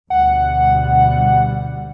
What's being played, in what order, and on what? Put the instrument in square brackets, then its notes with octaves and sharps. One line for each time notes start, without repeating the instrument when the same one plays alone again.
[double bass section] D2 B2 G3 [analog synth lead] F#5